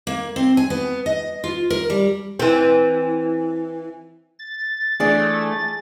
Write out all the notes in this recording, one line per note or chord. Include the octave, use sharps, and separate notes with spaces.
A#3
C4
G#5
B3
D#5
F4
A#4
G3
E3 C4
A6
E3 A3 D4 G#4 C#5